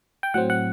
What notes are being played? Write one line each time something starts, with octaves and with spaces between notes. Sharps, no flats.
G5
A2 F#3 C4 F#5
F#5